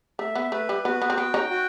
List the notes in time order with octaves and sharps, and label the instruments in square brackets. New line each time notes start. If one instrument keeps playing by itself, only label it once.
[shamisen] A3 [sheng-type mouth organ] E5
[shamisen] B3
[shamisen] A3 [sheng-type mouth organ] B4
[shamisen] G3
[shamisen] B3 [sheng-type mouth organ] F#4
[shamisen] B3
C4
[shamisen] B3 [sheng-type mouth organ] G5
[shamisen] C#4 D#4
[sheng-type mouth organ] F#4